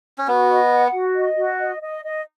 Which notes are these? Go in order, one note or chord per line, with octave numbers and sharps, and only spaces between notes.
C#4
B3 F#4
D#5
F#5
F#4
D#5
F#4
D#5
D#5
D#5